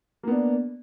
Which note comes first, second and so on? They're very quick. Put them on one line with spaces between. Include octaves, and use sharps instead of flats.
A#3 B3 D4